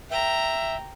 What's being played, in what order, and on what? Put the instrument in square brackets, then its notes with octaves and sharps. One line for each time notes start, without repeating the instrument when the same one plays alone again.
[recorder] E5 [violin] G5 A#5